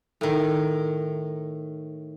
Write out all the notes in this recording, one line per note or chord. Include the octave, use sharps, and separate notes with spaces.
A2 D#3